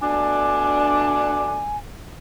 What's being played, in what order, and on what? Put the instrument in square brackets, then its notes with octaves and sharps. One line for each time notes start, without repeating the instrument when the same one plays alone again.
[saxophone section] B2 A3 D4 [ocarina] G#5